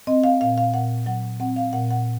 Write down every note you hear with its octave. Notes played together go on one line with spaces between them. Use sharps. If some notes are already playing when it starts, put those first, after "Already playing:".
C4 D#5
F5
A#2 F5
F5
A#2 F#5
F#3 F#5
C4 F#5
F5
A#2 F#5
F#5